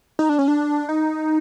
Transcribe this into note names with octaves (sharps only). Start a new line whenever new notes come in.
D#4
D4
C#4
D4
D#4